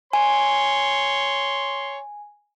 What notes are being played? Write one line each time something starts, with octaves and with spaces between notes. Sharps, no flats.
C#5 G#5 C6